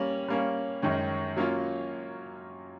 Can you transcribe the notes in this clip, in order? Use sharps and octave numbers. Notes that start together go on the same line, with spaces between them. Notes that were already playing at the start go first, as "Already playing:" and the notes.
Already playing: G3 A#3 C#4
G3 A#3 C#4
F#2 D#3 G#3 C#4
F#3 A#3 C#4 F4